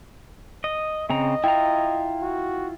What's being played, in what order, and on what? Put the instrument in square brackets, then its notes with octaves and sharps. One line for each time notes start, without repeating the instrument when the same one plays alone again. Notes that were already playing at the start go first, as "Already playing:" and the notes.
[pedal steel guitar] D#5
[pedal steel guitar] C#3 C4 A#5 [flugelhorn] D#5
[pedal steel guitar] E4 F4 A#5 [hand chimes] G5
[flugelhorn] F#4